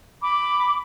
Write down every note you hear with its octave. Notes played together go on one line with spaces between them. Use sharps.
B5 D6